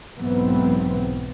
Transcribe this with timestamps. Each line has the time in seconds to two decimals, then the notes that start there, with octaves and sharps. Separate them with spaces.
0.17 B1 G#2 E3 B3 C4